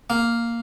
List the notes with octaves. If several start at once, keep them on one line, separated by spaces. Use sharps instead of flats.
A#3